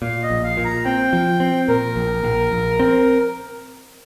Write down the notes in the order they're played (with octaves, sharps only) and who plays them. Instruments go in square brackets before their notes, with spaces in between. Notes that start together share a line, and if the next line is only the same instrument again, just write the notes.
[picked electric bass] A#2 [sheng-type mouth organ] F5
[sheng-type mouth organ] D#5
[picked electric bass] A#1
[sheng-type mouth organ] F5
[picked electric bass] A#2
[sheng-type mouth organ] A#5
[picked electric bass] C4 [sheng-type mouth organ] G5
[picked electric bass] F3
C4
[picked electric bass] A#2 [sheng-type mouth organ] A#4
[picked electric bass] A#1
A#1
A#1
C4